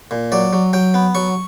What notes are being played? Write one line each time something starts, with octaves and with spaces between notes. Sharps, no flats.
A#2
F#3 D5
F#3
F#3 G5
B3
F#3 C#6